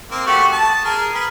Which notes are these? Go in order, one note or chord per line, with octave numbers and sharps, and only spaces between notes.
A#3 C4
A3 F#4 G4
A5 D#6
G#4 A#4
G#4 A#4 B4